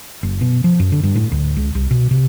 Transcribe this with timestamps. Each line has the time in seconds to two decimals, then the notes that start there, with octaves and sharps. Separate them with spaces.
0.23 F#1
0.41 B2
0.64 F3
0.80 F#2
0.92 D3
1.03 G2
1.15 A2
1.31 D2
1.57 C#2
1.75 C2
1.91 B2
2.11 C3